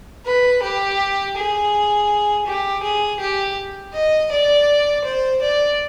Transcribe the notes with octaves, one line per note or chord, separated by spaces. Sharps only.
B4
G4
G#4
G4
G#4
G4
D#5
D5
C5
D5